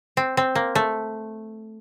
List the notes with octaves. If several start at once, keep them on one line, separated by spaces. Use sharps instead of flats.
C4
C4
A#3
A3